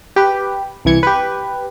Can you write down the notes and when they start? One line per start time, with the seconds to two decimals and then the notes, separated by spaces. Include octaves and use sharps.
0.16 G4 B4
0.85 C2 E3 G#6 C#7
1.03 G4 B4